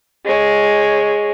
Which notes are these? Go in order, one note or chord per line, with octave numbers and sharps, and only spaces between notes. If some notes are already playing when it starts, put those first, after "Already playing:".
G#3 C#5